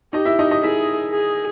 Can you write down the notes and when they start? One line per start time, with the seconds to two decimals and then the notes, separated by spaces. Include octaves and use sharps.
0.13 D#4 G4 D#5
0.25 E4 E5
0.39 D#4 D#5
0.51 D#4 D#5
0.63 E4 G#4 E5
1.13 G#4